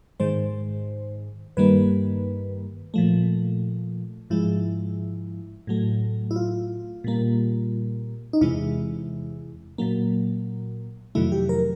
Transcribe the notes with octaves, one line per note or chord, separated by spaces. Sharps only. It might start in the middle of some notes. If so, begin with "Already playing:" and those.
G#2 D#3 G#3 C5
G2 D#3 G3 A#3 B4
A#2 F3 A3
G#2 F3 G#3 E4
A2 F#3 A3
E4
F4
A#2 G3 A#3
D#4
E2 C3 E3 G#3 E4
A#2 F#3 A#3
F2 C3 D#3 F#3 A3 E4
G4
A#4